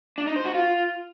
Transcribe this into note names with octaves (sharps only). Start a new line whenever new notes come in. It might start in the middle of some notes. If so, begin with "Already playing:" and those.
D4
D#4
C5
F#4
F4